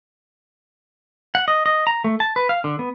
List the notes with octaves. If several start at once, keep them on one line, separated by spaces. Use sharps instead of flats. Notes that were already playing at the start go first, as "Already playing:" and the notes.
F#5
D#5
D#5
A#5
A3
A5
B4
F5
D3
B3